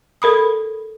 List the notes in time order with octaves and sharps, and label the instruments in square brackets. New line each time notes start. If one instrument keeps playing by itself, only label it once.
[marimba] A4 A#4 B5 D#6